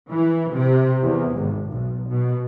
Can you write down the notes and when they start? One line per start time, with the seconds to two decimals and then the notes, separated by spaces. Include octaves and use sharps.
0.12 E3
0.55 C3
1.03 E2
1.36 G#1
1.72 B1
2.10 B2